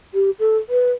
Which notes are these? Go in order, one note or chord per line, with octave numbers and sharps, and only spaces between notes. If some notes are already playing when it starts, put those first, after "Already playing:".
G4
A4
B4